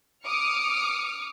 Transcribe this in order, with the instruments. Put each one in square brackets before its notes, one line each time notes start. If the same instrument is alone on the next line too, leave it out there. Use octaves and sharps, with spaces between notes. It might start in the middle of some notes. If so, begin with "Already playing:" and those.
[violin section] D6 D#6 F6 C#7